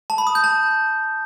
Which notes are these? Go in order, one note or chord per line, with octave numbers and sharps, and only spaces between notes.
A5
B5
D#6
G6
A5